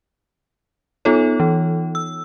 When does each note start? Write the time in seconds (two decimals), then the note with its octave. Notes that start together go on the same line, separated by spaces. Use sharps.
1.05 B3 D#4 F4 A4 C#5
1.40 E3
1.95 E6